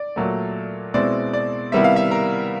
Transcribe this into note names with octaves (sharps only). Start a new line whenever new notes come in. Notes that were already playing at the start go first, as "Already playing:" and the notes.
Already playing: D5
A#2 F#3 A3
B2 G#3 C4 E4 D5
D5
C3 D#3 G3 B3 E4 E5
F5
E5
A#4